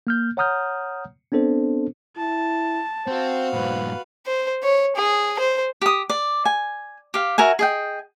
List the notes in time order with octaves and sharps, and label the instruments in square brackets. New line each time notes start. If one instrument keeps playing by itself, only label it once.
[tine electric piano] A#3 F6 G6
C#5 F#5 A#5 D#6 F6 G6
B3 C4 D4 A4 C5
[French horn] E4 [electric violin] A5
[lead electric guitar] C4 [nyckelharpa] F#4 F5 [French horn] C5
[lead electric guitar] G2 A#2 [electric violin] B4
[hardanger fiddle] C5
C#5
G#4
C5
[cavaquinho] G4 D#6
D5
G#5
G4 F5
F#4 A#4 E5 G#5
G#4 D#5 G5